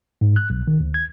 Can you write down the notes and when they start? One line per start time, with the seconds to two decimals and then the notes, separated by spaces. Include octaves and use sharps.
0.21 G#2
0.36 F#6
0.50 B1
0.67 D#3
0.80 D2
0.94 G#6